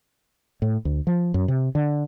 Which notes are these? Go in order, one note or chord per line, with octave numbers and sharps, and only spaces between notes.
A2
D2
F3
F#2
C3
D3